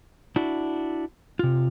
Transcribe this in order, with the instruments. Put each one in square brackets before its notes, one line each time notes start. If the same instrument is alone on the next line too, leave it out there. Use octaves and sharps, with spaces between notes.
[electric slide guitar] D4 E4 F#4
C3 F4